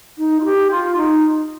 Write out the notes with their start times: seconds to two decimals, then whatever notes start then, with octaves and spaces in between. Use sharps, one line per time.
0.18 D#4
0.40 F4
0.44 G4
0.70 F4
0.96 D#4